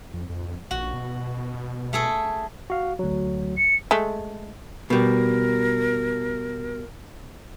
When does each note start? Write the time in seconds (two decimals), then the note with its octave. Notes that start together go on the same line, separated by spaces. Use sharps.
0.13 F2
0.29 F2
0.71 A#1 F#4
0.94 B2
1.93 A3 G#4 A4
2.70 F#4 F5
2.99 D2 F#3
3.57 C#7
3.91 G#3 A3
4.90 B2 G3 A#4